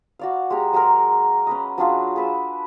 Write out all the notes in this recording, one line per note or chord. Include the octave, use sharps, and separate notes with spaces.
F#4 D5 F5
G#3 G4 G#4 A#5
F#3 G#3 G#4 A#4
C#4 B4 D#5
F#3 D4 F4 G#4
G#4 B4 E6